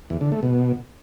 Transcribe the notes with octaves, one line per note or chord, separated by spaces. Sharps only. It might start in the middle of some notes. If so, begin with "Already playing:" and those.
E2
D3
A3
B2